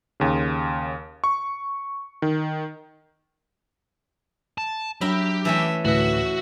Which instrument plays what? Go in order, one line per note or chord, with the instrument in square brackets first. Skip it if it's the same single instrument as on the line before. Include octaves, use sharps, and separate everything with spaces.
[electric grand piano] D#2 C#3
C#6
D#3
[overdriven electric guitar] A5
[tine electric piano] F#3 D4 [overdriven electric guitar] G4 [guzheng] A#4 E5 B5
[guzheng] E3 A3 C#4 [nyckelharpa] E5
[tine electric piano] D2 A2 B4 [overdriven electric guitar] F#4 [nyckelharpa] E5